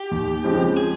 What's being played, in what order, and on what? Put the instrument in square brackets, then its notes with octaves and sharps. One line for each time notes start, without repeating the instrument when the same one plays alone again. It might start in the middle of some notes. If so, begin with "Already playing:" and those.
Already playing: [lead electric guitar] G4
[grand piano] D#2
C#3 F3 G#3 C4
[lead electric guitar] G#4